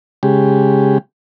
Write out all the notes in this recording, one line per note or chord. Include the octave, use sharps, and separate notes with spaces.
C#3 G#3 G4